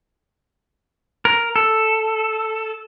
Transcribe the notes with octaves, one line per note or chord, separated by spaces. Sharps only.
A#4
A4